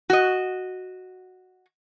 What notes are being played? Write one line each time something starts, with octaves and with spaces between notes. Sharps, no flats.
F#4 D#5